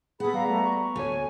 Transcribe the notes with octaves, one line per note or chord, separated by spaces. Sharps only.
B3 G#4 A4 F#5 B5
G3 F5 A#5
A3
C#6
D2 A3 C#5 G#5